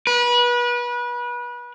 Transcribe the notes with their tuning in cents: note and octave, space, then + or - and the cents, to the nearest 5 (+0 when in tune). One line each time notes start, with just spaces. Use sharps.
B4 -30